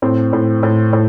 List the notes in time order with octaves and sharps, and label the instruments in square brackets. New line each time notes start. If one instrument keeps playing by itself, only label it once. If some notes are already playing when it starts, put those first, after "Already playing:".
[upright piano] A2 C4
A2
A2
A2